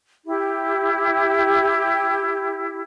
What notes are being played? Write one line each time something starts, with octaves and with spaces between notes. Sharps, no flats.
E4 G4